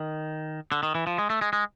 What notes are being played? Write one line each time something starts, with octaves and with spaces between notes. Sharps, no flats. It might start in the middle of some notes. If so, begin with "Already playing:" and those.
Already playing: D#3
D3
D#3
E3
F3
G#3
A3
G#3
G#3